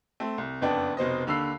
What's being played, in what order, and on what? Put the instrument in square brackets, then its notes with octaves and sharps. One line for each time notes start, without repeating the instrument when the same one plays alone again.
[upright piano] A3 C4
C2
F#1 F2 B3 D4 G5 A5
F1 B2 C5 D#5
D#2 D3 B5 E6 C7